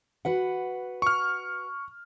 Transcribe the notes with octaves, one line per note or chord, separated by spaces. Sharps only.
F#4 B4 F#5
C#6 F6